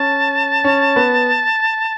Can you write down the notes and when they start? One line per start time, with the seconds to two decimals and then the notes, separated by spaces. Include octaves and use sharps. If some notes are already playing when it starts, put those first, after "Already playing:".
Already playing: C#4 A5
0.64 C#4
0.96 B3